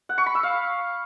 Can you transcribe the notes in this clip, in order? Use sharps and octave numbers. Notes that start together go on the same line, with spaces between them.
F#5
C#6
B5
E6
F5